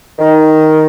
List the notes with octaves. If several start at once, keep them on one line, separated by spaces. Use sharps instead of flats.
D#3